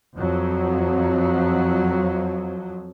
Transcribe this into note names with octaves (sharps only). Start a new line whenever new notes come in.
F2 F3 F#3